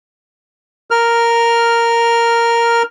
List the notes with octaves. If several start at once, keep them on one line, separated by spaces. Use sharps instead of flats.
A#4 F6